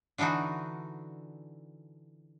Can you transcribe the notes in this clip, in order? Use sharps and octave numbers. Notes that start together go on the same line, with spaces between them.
D3 E3 D4 D#4 F#4